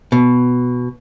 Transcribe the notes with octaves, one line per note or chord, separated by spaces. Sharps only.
B2